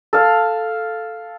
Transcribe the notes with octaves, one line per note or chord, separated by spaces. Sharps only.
A4 F5